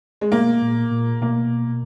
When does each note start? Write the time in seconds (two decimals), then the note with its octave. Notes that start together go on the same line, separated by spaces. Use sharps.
0.21 G#3
0.31 B2 A#3
0.61 A#2
0.91 A#2
1.21 B2 A#3